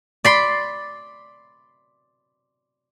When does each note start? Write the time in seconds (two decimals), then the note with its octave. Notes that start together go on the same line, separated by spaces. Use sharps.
0.25 D5 B5 C6